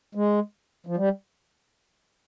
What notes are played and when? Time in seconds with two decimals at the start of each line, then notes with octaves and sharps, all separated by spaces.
0.15 G#3
0.87 F3
0.97 G3